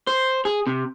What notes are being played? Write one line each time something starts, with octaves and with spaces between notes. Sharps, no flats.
C5
G#4
C3